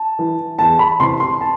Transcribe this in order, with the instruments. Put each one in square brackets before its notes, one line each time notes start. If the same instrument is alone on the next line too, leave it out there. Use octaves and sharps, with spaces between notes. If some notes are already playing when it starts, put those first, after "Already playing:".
Already playing: [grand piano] A5
E3
E2 A5
B5
C3 E3 C6
C6
A5